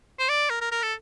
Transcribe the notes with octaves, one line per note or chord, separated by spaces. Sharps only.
C5
D5
A#4
A#4
A#4
A4